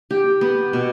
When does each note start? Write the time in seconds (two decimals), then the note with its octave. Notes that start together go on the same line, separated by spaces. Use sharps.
0.11 G4
0.41 B3
0.73 B2